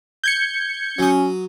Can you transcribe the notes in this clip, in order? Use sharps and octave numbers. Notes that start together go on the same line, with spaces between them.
G6 G#6 C#7
F#3 C#4 D#6